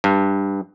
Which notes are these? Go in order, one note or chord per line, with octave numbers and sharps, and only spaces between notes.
G2